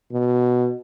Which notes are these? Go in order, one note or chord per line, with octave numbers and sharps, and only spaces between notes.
B2